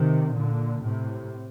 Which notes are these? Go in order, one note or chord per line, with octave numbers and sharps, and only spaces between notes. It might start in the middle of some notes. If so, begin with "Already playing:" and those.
Already playing: C3 D#3
A#2 D3
A2 C3